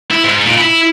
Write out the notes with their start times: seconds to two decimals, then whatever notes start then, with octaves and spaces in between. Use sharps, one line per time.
0.11 E4
0.24 G#2
0.45 A#2
0.58 E4